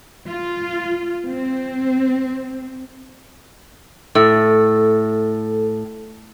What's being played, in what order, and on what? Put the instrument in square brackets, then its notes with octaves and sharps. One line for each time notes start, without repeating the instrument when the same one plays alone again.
[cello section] F4
C4
[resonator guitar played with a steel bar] A2 [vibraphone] A4